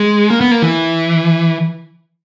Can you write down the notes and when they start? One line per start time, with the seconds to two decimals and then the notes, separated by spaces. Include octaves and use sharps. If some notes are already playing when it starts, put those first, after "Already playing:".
Already playing: G#3
0.30 A#3
0.41 B3
0.51 A#3
0.62 E3